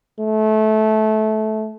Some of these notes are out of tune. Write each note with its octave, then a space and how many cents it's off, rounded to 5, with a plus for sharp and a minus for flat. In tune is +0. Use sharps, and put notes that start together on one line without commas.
A3 -20